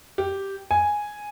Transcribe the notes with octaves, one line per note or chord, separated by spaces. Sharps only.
G4
G#5